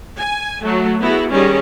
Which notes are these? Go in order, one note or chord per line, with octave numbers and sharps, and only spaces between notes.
G#5
F#3 A3
B3 E4 F#4 G#4
D#3 G3 C#4 G#4